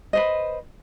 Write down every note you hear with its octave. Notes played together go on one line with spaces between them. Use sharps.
B4 C5 D#5